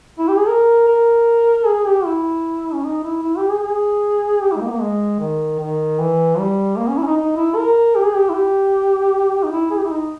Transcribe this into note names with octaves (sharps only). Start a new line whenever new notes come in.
E4
G4
G#4
A#4
A#4
G#4
G4
E4
C#4
D#4
E4
E4
G4
G#4
G#4
G4
E4
G#3
A#3
B3
A#3
G#3
D#3
D#3
E3
G3
A#3
C#4
E4
C#4
D#4
D#4
E4
A#4
G4
G#4
G4
E4
G4
D#4
E4
G#4
G4
E4
D#4